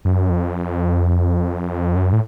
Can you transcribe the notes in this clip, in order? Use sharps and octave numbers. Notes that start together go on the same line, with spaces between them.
F#2
F2
F#2
A2